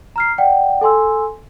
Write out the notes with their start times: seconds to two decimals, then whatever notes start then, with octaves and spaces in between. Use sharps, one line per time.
0.16 A#5 F6 C7
0.38 D5 F#5 G5
0.81 A4 G#5 C6 E6